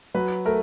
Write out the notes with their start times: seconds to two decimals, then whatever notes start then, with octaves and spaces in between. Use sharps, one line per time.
0.14 F#3 B4
0.45 A3 A#4